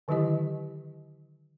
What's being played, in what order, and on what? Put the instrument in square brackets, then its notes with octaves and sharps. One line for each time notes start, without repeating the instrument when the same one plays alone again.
[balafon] D3 D#3 F#3 E4 G4 D#5